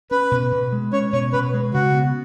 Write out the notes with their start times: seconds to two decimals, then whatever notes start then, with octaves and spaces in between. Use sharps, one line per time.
0.11 C#4 B4
0.31 B2
0.52 B2
0.72 G#3
0.93 C#4 C#5
1.13 B2 C#5
1.33 B2 B4
1.54 G#3
1.74 C#3 F#4
1.94 B3